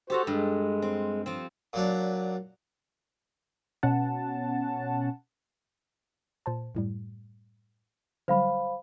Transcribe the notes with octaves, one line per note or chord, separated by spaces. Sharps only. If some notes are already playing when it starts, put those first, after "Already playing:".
F#4 G4 A4 C5 A#5
G2 G#3
C4
F3 C4
A#2 F#3 D4
B2 C#4 F#5 A5
A#2 C5 A5
F#2 A2 G3
D3 F#3 G3 C5 F5 B5